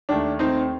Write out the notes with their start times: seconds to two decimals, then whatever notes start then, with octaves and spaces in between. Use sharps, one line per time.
0.09 D#2 D#3 A3 D4
0.39 C4 D#4